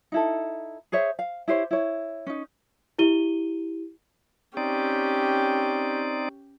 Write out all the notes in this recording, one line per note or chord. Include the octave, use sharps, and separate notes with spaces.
D#4 E4 A4
G#4 C5 C#5 E5
F5
E4 G4 C5 C#5
E4 C#5
C#4 D#4
E4 G4 D#7 G7
C4 C#4 D#4 G4 D5